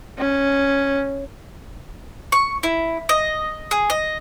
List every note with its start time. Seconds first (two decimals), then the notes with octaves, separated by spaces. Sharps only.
0.19 C#4
2.32 C#6
2.63 E4
3.09 D#5
3.71 G#4
3.90 D#5